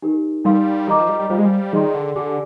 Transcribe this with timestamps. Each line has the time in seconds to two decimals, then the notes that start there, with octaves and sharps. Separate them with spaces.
0.02 D#4 G4 A#4
0.44 G3 D#4 A#4 F5 C6
0.87 D#3 A#4 D#5 A#5 D6
0.99 F3
1.09 G3
1.19 G3
1.30 G3 F4 C5 F5
1.38 G#3
1.45 G3
1.72 D#3 G#4 D5 G5 C6
1.94 D3
2.15 D3 G4 D5 G#5 D6